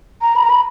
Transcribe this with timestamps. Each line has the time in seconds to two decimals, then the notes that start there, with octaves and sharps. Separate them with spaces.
0.22 A#5
0.36 B5
0.43 A#5
0.50 B5